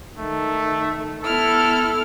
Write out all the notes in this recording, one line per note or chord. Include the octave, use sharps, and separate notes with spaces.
D#3 A3
B3 E4 A4 F6